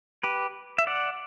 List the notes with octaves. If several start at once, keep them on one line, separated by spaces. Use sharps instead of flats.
G4 B4
E5
D5 F#5